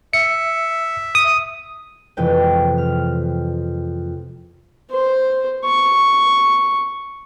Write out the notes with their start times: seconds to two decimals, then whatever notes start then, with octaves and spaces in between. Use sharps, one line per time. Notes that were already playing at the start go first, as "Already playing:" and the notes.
0.13 E5 C#7
1.15 D#6
2.17 F2 C3 E3 G#3 B4 G5
2.78 F6
4.91 C5
5.65 C#6